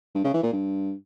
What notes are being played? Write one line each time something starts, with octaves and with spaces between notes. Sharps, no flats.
G2
C#3
E3
A#2
G2